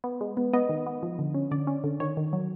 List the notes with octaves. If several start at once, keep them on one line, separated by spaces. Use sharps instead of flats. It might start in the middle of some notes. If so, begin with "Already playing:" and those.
B3
G#3
B3
B3 D#5
D#3
B3
F3
D3
C#4
D3 D5
C#4
D3
D#3 C#5
D#3
F#3